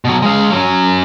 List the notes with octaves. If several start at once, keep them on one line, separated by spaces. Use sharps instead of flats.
B2 F#3
G#3 F5
F#3 C#4